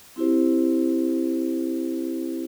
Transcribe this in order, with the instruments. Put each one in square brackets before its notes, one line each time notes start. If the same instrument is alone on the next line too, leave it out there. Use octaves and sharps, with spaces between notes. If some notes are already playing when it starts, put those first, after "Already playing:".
[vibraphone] C4 E4 F#4 G4 C5